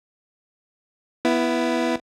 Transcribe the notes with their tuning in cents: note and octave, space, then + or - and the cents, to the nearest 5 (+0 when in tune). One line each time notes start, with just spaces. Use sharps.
B3 -5 E4 +10